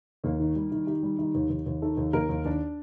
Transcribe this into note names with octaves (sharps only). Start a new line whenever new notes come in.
D#2 A#3 A#4
D#3
G3
D#3
D#3 G4
G3
D#3
D#2
D#2
D#2
D#3 A4
D#2
D#2 A#3 A#4
D#2
D#2 D4 D5